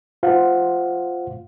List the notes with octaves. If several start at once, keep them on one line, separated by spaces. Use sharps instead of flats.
F4 C5 F5 F#5